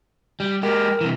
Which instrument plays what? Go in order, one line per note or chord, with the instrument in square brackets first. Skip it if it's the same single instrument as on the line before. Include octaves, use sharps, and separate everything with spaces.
[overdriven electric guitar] G3
[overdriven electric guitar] G#3 G4 [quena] A#4
[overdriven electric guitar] C3 E3